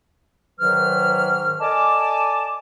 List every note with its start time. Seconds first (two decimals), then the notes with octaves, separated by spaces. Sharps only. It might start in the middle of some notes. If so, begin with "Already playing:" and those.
0.60 G#2 D#3 F#3 B4 F6
1.61 A4 D5 D#5 G#5 A5 D6